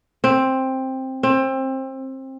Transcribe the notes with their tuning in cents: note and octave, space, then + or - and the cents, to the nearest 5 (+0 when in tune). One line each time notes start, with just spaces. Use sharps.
C4 +10
C4 +25